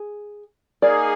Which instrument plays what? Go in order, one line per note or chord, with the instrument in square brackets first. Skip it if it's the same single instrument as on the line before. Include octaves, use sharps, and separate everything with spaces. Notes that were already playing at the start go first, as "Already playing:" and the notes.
Already playing: [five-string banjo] G#4
[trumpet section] A#3 D#4 G#4 [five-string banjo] A#4 D5